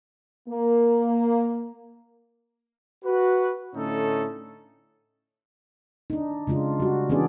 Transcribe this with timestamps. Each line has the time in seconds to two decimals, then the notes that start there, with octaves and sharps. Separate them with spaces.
0.48 A#3
3.04 F#4 B4
3.75 A2 D3 C#4 D#4 A4
6.10 D4 D#4
6.47 C#3 G#3 D4 F4
6.80 G3 F#4
7.10 E3 B3 C#4 D4 G#4 D5